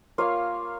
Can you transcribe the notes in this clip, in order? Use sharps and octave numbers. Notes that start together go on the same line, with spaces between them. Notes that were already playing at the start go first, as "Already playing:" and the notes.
A#3 F4 C#5 F5